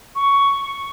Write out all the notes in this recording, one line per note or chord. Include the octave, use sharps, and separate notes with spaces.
C#6